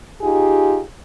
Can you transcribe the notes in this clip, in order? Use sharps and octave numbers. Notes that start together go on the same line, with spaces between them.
D#4 F4 G4 G#4